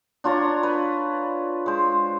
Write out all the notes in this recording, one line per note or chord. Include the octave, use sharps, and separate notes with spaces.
D4 F4 C#5 A#5
B4
G#3 C5